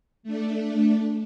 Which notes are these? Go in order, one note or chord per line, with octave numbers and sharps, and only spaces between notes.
A3 D4